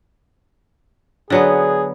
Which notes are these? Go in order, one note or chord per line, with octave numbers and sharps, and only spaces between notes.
D3 F#3 B3 G#4 C#5 D5